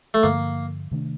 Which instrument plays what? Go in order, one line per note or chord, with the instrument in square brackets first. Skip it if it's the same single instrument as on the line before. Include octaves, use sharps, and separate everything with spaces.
[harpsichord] A3
[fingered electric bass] G2 D3 F3 [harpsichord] A#3
[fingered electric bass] C3 D#3 A3 D4